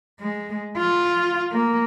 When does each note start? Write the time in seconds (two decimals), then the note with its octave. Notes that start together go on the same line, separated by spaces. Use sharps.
0.20 G#3
0.77 F4
1.52 A#3